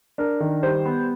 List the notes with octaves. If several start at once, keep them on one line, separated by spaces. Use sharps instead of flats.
D4 A#4
D#3
G3 C5
B3